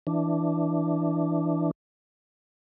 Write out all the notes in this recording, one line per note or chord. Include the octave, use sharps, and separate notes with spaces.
E3 D4